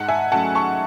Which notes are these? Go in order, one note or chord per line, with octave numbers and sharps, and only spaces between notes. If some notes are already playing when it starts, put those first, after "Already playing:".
Already playing: G#2 F#5 A5
E5 G#5
F#3 A3 C#4 F#5 A5
A5 C#6